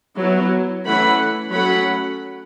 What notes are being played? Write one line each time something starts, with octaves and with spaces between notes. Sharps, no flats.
F#3 B3 E4
E3 A3 C#4 F#5 B5
F#3 A3 C#4 F#5 B5